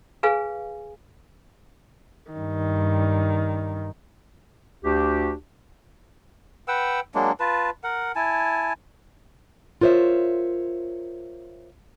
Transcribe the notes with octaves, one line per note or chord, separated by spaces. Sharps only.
G#4 B4 F5 G#5
G2 D#3
D2 D4 F#4 G4
B4 F#5 G5 E6
F#3 G#3 A#3 D4
F4 B4 A5
A#4 F#5
E4 G#5 A5
F4 A#4 C5 C#5 E5